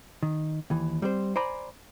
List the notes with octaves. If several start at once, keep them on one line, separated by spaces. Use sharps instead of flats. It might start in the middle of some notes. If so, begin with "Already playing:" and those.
D#3
D#2 E3
G3 C4 C5
C5 D5 G#5 A#5 B5